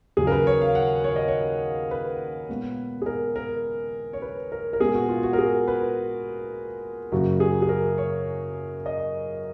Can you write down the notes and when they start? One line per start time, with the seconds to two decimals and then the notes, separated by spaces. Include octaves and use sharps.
0.17 D#2 C#3 F#3 G#4
0.27 A#4
0.31 B4
0.47 C#5
0.61 F5
0.75 F#5
1.04 C#5
1.16 D#5
1.28 C#5
1.91 B4
2.49 A#2 G#3 B3
3.02 G#4
3.06 A#4
3.36 A#4
4.13 C#5
4.22 B4
4.52 A#4
4.73 A#4
4.80 A#2 G#3 B3 G#4
4.95 F#4
5.09 F4
5.23 F#4
5.33 A#4
5.38 G#4
5.68 B4
7.12 F#2 C#3 F#3 A#3 F#4
7.40 G#4
7.62 G#4
7.69 A#4
7.98 C#5
8.86 D#5